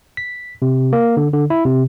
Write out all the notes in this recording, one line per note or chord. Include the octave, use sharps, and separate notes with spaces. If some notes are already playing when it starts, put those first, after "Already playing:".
B6
C3
A#3
D3
D3
E4
C3